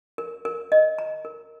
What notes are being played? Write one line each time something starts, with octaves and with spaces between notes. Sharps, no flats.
A#4
A#4
D#5
A#5
A#4